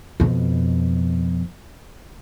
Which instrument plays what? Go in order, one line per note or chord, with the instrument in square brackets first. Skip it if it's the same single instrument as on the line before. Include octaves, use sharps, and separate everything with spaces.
[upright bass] F2 B2